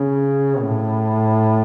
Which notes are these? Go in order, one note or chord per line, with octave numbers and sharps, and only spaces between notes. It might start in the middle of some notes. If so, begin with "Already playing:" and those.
Already playing: C#3
A2